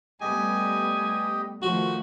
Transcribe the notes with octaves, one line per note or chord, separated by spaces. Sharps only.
G3 A3 B3 G4 D#5 G#5
D#3 F3 A3 F#4